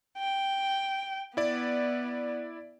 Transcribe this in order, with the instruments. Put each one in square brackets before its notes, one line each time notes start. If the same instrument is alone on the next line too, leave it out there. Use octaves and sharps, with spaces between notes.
[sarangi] G5
[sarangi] B3 [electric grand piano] E4 D5